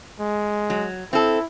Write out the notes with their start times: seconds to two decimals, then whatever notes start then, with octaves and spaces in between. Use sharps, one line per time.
0.20 G#3
0.70 F#3
1.13 C4 E4 A4